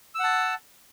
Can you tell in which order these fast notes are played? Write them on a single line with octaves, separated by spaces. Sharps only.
E6 F#5 A5